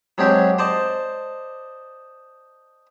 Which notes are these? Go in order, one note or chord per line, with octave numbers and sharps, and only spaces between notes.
F#3 G#3 C4 D4 G4
C5 D5 D#5 A5